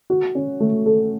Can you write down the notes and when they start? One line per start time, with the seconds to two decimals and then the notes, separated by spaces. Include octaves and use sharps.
0.10 F#4
0.35 C#4
0.60 A3
0.86 A4